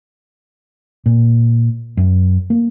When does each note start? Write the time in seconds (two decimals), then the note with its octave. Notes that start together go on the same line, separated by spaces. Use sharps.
1.06 A#2
1.97 F#2
2.50 A#3